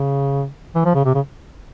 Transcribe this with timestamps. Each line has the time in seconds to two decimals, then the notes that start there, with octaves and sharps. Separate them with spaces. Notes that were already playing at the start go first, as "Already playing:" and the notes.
Already playing: C#3
0.75 E3
0.85 F3
0.95 C#3
1.05 C3
1.15 C#3